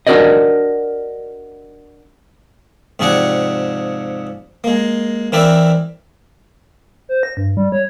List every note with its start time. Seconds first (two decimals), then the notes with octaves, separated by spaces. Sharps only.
0.07 D4 F#4 G4 A#4 D5 D#5
2.99 G#2 C3 F3 G#4 D5 F#5
4.64 G#3 A#3
5.32 E3 C4 A#4 B4 D5 E5
7.09 C5
7.23 A#6
7.37 G2
7.57 G3
7.72 C#5